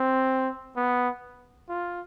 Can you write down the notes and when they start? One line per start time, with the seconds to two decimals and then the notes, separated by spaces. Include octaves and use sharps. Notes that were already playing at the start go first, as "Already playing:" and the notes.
Already playing: C4
0.77 B3
1.69 F4